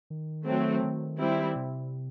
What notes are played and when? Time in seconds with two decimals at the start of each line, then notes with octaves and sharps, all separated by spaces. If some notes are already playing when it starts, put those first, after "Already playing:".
0.10 D#3
0.47 F#3 A3 C4
0.83 D#3
1.19 G3 C4 E4
1.55 C3